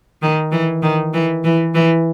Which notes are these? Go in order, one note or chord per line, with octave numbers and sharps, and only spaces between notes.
D#3
E3
D#3
E3
E3
E3